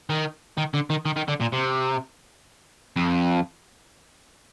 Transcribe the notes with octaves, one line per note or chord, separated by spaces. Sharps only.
D#3
D#3
D3
D#3
D#3
D#3
D3
A#2
C3
F2